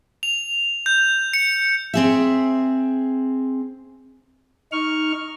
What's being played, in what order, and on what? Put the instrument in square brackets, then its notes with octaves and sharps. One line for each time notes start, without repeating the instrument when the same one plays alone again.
[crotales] F7
G6
C#7
[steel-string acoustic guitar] C4 G#4 E5
[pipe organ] D#4 C#6 F6